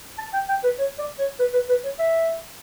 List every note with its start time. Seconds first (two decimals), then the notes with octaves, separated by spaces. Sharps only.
0.19 A5
0.33 G5
0.49 G5
0.64 B4
0.79 C#5
0.99 D5
1.19 C#5
1.39 B4
1.54 B4
1.69 B4
1.84 C#5
1.99 E5